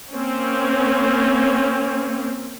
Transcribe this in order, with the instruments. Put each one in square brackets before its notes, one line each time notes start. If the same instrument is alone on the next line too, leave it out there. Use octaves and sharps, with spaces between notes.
[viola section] A#3 C4 C#4